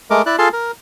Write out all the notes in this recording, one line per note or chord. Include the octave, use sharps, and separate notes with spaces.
G#3 A3 A#4 D6
E4 D5 F#6
F4 G#4 A4 F5 A5 C6
A#4